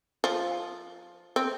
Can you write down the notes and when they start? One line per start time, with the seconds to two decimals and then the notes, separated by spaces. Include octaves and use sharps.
0.24 F3
1.36 C4